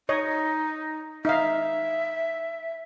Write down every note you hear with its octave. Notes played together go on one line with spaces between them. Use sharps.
D#4 C#5 D#5
D#4 E5 F5